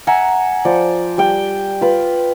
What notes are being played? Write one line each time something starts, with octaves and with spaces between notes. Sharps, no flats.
E5 F#5 G#5 A#5
F3 C5 D5
G3 G5
F4 B4